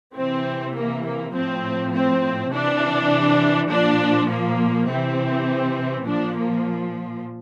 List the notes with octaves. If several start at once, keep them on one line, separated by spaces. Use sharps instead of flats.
C3 E3 C4
A#3
A#3
A2 F3 C4
C4
C3 E3 D4
A#2 F3 D4
A#3
C3 E3 C4
A#2 F3 D4
A#3